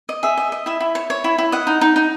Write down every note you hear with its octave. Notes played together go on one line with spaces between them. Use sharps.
D#5
G#4 E5
D#5
D#5
E4 E5
E4
C#5
C#5
E4
E4
D#5 F#5
D#4
D#4
D#4